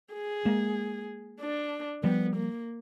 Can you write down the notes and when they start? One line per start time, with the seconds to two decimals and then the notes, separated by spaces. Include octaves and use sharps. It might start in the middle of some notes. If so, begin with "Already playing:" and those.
0.14 G#4
0.45 G#3 A#3
1.40 D4
2.03 F3 G3 B3
2.36 A#3